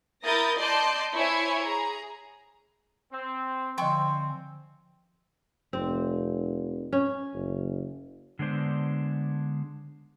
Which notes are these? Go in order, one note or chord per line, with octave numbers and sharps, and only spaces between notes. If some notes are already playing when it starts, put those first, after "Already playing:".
E4 A#4 D#6 G6 A6 A#6
D5 D#5 A5 C6 D6 G6
E4 C5 C#5 E5 G#5 C#6
G#4 A#5
C4
D3 F3 C4 D#5 G5 G#5 C6 C#6
F1 C4
C#4
F#1
D3 G#3 B3 D4 C5